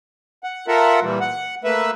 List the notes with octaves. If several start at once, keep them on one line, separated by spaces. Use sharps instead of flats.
F#5
F4 A4 A#4 E5 F#5
A#2 E3 G3
F#5
A3 A#3 B4 E5